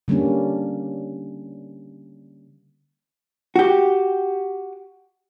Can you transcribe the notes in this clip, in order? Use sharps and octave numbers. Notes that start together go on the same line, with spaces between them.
D3 G3 A#3 C#4 D4
F#4 G4